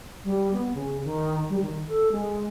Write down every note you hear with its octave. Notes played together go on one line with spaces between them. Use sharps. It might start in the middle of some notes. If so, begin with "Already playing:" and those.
G3
B3
C#3
D#3
G3
D#3
A4
G#3